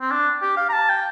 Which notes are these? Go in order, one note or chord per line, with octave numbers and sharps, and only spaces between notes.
C4
D4
G4
F5
A#5
A5
G5